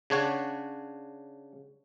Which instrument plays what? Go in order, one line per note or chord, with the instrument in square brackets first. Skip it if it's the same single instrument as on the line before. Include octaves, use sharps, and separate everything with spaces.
[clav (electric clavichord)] C#3 D4 C#5 F#5